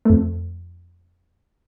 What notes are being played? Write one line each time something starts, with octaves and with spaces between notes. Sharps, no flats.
F2 A3